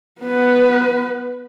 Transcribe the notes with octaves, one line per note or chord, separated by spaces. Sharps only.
B3 B4